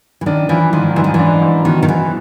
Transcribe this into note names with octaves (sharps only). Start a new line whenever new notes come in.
E3
D#3 D4
E3 F3
G#2 D#3
G#2 E3
D#3
E3
D4
G#2
B2 D#3
D#3
B2 E3